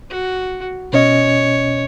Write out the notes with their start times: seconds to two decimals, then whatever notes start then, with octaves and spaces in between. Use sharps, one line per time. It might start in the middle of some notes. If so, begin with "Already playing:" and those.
0.10 F#4
0.93 B2 C#4 C#5 D#5